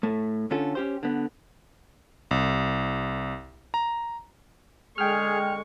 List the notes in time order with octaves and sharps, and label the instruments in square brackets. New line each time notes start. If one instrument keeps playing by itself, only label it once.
[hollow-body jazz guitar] A2 A3
D3 C#4 F4 A4
C#4 G4 C5
D3 B3
[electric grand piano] C2
A#5
[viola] D3 C#6 [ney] G#3 [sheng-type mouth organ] G#4 [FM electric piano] G5 F6